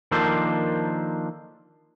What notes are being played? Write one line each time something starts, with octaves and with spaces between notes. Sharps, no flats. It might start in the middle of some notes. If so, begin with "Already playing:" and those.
D#3 F3 A#3 D4 A4 C5